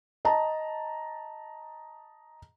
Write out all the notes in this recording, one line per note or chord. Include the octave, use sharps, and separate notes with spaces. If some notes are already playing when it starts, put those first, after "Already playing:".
D#5 A5 A#5